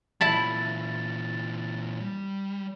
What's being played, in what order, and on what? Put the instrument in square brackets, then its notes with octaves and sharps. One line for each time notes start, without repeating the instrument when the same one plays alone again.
[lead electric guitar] A#2 E3 [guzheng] E4 A5 B5 [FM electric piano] A6
[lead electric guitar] G3